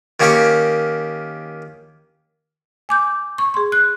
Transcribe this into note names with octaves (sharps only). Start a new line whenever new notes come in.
D#3 A#3 C#4 G4 C#6 D6
G#5 D6 G6
C#6
G#4 C6
F#6